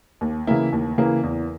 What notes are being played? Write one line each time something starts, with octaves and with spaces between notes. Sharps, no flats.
D#2
C#3 E3 A#3 E4
D#2
C#3 E3 A#3 E4
E2